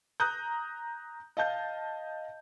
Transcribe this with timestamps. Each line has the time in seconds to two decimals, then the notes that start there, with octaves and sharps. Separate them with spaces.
0.20 A#5 D#6 F#6 G6
1.37 D#5 F5 A5 G6